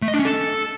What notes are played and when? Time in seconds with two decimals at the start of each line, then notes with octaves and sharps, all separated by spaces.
0.02 A3
0.08 D#5
0.14 D4
0.19 C#4
0.25 A4